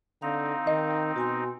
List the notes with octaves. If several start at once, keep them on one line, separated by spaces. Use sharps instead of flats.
D3 C4 D#4 F5
D#3 D#5
B2 F#4 G#5 C6